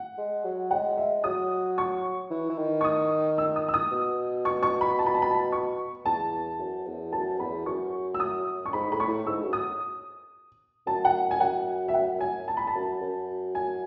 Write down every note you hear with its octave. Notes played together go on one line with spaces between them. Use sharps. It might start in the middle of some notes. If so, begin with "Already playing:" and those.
Already playing: F#5
G#3
F#3
G#3 F#5
G#3 E5
F#3 D#6
C#6
E3
E3
D#3
C#6
D#6
E6
D#6
E6
D#6
B2
C#6
C#6
B5
A5
B5
A5
B5
A5
C#6
E2 A5
F#2
E2
F#2 A5
E2 B5
F#2 C#6
E6
D#6
C#6
G#2 B5
A2 B5
C#6
A2
G#2 E6
F#2
D#6
F#2 A5
F#5
G#5
F#2 F#5
E5
F#5
G#5
A5
B5
A5
F#2
F#2
G#5